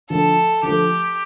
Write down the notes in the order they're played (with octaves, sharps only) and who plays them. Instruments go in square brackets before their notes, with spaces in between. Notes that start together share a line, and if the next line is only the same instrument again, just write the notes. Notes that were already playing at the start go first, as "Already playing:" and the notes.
[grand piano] D3 F3 A3 [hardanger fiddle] A4
[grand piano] D3 F3 A3 [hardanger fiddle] G4